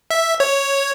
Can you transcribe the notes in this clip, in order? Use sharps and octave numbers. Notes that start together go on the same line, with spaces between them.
E5
C#5